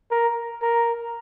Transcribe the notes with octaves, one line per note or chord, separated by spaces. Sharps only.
A#4
A#4